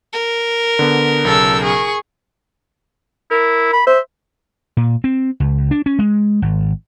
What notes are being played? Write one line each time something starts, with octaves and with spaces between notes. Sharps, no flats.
A#4
D3 B3
B1 C#3 A4 E6
G#4 C#6
E4 A#4
B5
C5 E5
A#2
C4
C#2
D4
C#4
G#3
G#1